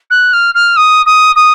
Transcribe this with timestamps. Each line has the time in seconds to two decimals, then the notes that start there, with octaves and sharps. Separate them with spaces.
0.10 F#6
0.33 F6
0.54 F6
0.76 D#6
1.06 D#6
1.36 D#6